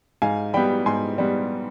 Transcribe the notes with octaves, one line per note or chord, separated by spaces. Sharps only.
G#2 F5 G#5
G3 B3 G5 B5
G#2 G#5 C6
G3 B3